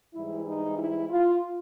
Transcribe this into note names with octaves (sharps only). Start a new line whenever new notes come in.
G#2 E3 G3 E4
D#4
E4
F4